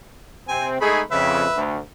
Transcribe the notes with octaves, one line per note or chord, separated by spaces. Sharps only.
C3 C4 G#5
G#3 A3 D#4 G#4 B5
F2 C#3 B4 E5
D2